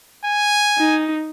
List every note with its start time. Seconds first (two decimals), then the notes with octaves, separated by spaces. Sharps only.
0.24 G#5
0.78 D#4